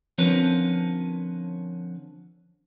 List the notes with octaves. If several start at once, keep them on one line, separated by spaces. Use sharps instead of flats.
D3 F3 C4 C#4 A#4 B4